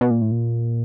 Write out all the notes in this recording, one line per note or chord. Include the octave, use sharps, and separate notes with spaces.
B2
A#2
A2
A#2